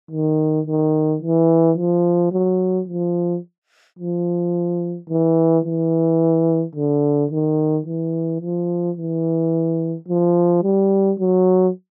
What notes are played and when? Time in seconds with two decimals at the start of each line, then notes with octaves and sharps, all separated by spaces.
0.11 D#3
0.67 D#3
1.22 E3
1.77 F3
2.32 F#3
2.88 F3
3.99 F3
5.09 E3
5.65 E3
6.75 D3
7.31 D#3
7.86 E3
8.41 F3
8.97 E3
10.08 F3
10.63 G3
11.19 F#3